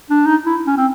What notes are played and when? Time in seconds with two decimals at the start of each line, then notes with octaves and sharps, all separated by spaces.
0.10 D4
0.26 D#4
0.46 E4
0.67 C#4
0.77 C4